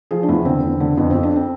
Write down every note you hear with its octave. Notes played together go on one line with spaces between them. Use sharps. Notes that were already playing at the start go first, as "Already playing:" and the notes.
F3 G#4
D4
E2 E4
D3 C4
E2
D3
F2 B3
F2 C4
D4
C4